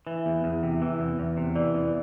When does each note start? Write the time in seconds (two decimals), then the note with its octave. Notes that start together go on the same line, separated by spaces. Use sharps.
0.07 E3 E5
0.26 E2
0.44 E2
0.63 C3
0.82 E3
1.00 E2
1.19 E2
1.37 C3
1.55 E3 D5
1.74 E2